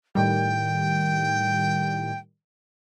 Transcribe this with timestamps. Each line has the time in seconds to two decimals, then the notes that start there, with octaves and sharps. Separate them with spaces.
0.15 A2 D#3 G3 G5